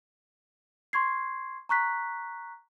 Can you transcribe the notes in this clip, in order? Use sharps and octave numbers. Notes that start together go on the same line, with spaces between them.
C6 C#6 G#6 C7
A#5 C#6 F#6 B6